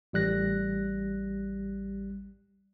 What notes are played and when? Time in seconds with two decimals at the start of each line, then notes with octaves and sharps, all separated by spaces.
0.13 A1 G3 F#6 A#6